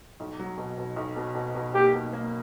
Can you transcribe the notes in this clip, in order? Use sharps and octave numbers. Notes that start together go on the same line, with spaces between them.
B1
F#3
B2
B2
B1
B2
B2
B2
A#3 G4
B2
A#3